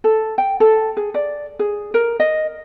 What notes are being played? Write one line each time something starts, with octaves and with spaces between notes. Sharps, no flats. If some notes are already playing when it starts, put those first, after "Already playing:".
A4
G5
A4
G#4
D5
G#4
A#4
D#5